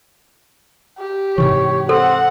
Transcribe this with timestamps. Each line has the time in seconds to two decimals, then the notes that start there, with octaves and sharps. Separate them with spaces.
0.98 G4
1.38 G#2 C3 E3 C#5
1.89 C4 A4 F#5